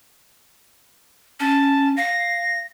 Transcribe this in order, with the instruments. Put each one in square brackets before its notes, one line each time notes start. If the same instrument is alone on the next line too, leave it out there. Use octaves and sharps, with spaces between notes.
[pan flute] C#4 [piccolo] A5
[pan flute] F5 [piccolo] A#6